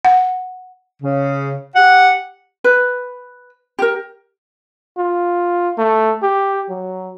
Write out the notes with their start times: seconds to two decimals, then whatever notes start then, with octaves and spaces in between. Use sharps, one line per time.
0.05 F#5
1.01 C#3
1.75 G4 F#5
2.64 B4
3.79 G4 A#4
4.98 F4
5.78 A3
6.23 G4
6.70 F#3